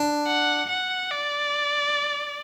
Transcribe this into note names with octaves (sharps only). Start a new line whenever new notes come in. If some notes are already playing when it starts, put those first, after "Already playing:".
Already playing: D4
F#5
F#5
D5